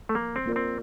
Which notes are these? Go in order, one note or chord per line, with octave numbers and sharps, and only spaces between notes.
A3
F3 A#3
C4
A#3 F4 A#4 D5
C4